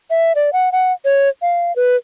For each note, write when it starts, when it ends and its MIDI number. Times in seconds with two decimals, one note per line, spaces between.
0.10 0.33 76
0.35 0.53 74
0.53 0.72 78
0.72 0.93 78
1.05 1.29 73
1.42 1.75 77
1.76 1.96 71